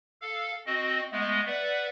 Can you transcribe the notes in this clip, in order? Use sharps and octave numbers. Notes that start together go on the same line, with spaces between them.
A4 F5
C4 F#4 D#5
G#3 A3 B3 D#5
B4 D5 E5 F#5